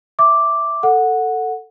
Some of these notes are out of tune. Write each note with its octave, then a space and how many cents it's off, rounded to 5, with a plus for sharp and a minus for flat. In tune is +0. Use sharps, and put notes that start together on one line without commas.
E5 +0 D6 +0
A4 +15 F#5 -10